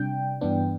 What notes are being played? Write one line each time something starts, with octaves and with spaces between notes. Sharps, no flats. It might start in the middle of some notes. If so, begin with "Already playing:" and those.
Already playing: C3 G3 D4 G5
G2 E3 B3 D4